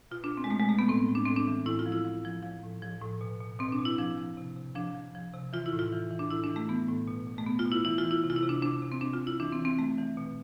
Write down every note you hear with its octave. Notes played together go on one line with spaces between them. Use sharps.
B2 F4
D4
B2
C4
G#3
B2 A3
G#3
B2 A3
B3
A2 C4
A2
D4
A2 C4
D4
E3
A2 E4
F4
F3
E4
F3
F3
F3
A2
F3
A2
B2
B2
B2 C4
D4
B2
E4
F3 D4
F3
C3
C3
F3 D4
F3
F3
C3
E3 F4
E4
A2
F4
E3
E3
D4
A2 E4
D4
E3
A3
E3 B3
A2
B2
B2
A3
B2 B3
F4
B2
E4
E3 E4
F4
E3
E4
C3
F4
E4
C3
D4
C3 D4
C3
C4
C3 D4
F4
C3
E4
E3 D4
C4
E3
C4
E3 A3
E3
B2